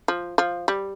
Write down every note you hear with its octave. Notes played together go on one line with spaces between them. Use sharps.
F3
F3
G3